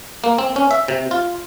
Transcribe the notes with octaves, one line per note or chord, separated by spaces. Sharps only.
A#3
C4
C#4
E5
C3
F4